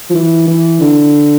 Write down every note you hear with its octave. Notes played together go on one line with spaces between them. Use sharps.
F3
E3
E3
D3